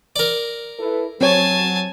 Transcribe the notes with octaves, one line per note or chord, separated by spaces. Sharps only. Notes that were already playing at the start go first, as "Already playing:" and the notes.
A#4 D5
E4 A4 B4
F#3 C4 C#5 G#5 A5